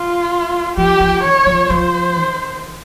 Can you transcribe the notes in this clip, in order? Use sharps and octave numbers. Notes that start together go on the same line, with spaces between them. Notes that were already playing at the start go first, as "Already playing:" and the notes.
Already playing: F4
F3 G4
F3
D#3 C#5
F3
F3 C5
D#3